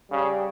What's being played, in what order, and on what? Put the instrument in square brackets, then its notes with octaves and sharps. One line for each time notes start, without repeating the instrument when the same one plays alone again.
[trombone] C#3 [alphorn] G3